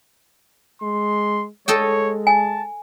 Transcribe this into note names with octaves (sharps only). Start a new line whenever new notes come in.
G#3 C6
G#3 A4 C#5 D#5 G5
G#5 A5